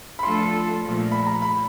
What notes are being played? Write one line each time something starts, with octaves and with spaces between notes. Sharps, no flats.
B5
F3 A3 D4 F4 A4 C6
A#2 F3 A3
B5
A#5
B5